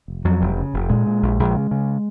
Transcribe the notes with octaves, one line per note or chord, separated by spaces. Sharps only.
F1
F2 F#3
F1
C#3
F1
A#2 G#3
A#2
A#1
A#1
C#3
C#3